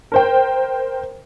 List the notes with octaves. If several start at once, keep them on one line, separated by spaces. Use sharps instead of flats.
A#4 C5 G5